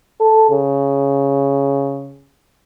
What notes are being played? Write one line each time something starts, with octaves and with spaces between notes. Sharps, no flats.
A4
C#3